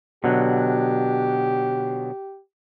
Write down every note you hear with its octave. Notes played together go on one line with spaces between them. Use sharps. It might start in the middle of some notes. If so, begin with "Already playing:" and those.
B2 D3 F#3 G4